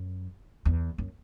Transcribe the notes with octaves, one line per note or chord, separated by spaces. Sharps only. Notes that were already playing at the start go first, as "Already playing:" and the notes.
Already playing: F#2
E2
F#2